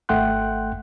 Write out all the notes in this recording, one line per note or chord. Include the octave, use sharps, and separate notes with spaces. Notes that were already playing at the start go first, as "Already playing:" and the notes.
G#1 A3 F#5 G5 C6 F#6